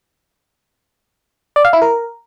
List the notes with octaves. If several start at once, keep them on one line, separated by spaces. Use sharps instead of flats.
D5
F5
E4
A#4